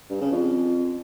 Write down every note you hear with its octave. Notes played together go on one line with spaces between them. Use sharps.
G2
C#3
F2